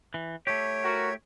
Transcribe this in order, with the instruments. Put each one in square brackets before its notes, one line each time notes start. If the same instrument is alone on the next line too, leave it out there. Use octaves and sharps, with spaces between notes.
[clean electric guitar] E3
[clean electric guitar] A3 E4 G4 [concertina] C#5
[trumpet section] F#4 A#4